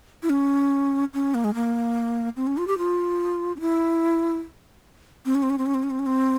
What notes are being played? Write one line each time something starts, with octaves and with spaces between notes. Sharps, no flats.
E4
C#4
C#4
A#3
G#3
A#3
C4
C#4
F4
G4
F4
C#4
E4
C4
C#4
C4
C#4
C4
C#4
C4
C#4
C4
C#4
C4